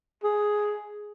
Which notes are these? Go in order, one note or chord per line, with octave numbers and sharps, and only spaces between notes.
G#4